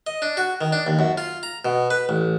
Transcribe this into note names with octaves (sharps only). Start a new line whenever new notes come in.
D#5
D4
F#4
D#3
D4
D#2
F#2
F4
A#5
B2
B4
A1